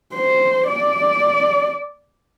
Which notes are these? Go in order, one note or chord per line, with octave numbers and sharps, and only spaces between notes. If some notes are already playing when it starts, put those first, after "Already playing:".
C5
D5